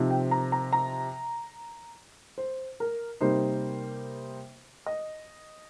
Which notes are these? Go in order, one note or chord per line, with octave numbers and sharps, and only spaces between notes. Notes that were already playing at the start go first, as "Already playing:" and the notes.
Already playing: C3 F3 C4 D#4
G5
A#5
A#5
A#5
C5
A#4
C3 G3 A#3 D#4 C5
D#5